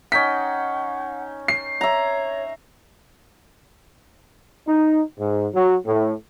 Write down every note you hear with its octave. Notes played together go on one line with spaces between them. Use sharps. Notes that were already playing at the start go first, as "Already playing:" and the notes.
C#4 D#4 F#5 G5 B6
C7
C#5 E5 A#5
D#4
G#2
F#3
A2